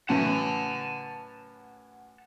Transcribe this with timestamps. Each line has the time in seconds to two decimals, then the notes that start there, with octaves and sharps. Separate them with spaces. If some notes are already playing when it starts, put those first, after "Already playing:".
0.09 F#2 A2 E3 F#5 A5